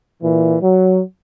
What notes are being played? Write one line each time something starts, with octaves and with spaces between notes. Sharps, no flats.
A#2 E3
F#3